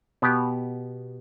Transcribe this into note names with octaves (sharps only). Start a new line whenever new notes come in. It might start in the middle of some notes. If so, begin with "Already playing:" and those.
B2 B3 G4